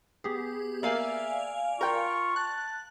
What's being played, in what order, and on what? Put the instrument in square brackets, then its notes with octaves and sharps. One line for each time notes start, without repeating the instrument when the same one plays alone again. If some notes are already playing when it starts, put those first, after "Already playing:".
[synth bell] B3 G4 G#4
[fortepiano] A#3 [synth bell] D5 F5 G#5 [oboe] E5
[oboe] F4 [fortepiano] A#4 G5 [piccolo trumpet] C#6
[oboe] A5 [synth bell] F#6